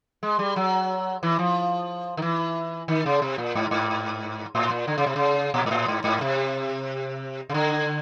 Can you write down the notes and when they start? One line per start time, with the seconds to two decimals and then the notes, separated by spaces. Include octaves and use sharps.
0.23 G#3
0.39 G3
0.56 F#3
1.23 E3
1.39 F3
2.17 D#3
2.22 E3
2.88 D#3
3.06 C#3
3.22 C3
3.38 A#2
3.55 G#2
3.71 G#2
4.55 A2
4.71 A#2
4.88 D3
4.98 C#3
5.06 C3
5.16 C#3
5.54 A#2
5.66 G#2
5.71 A2
5.88 G#2
6.04 G#2
6.21 C3
7.49 C#3
7.54 D3